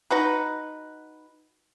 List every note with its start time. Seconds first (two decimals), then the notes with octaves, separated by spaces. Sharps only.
0.11 D#4 F#4 B4